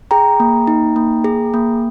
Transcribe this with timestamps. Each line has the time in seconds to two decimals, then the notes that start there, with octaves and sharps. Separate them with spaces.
0.11 G#4 G5 A#5
0.40 A#3
0.67 D#4
0.96 A#3
1.24 G#4
1.54 A#3